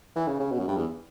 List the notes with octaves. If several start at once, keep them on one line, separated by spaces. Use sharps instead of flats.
E3
C#3
C#3
B2
F#2
G2
E2